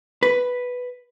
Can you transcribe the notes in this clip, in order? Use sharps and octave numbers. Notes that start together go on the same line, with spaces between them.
B4